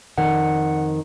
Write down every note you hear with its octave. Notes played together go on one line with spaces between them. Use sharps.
F2 D#3 F#5